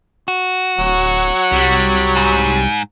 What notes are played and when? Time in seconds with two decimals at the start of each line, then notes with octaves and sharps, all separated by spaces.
0.28 F#4
0.78 D1 F#3
1.52 C2 G3
2.16 G#2